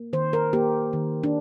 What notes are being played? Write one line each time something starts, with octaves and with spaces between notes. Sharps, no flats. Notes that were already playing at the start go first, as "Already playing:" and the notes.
Already playing: A#3
D#3 C5
A#4
A#3 G4
D#3
D4